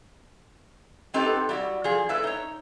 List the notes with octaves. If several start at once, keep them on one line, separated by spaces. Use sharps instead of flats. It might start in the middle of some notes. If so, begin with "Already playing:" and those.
B3 C4 D#4 G4 A4 B4
G3 E4 F#4
F3 G#4
A3 E4 B4 E5
D#4 C#5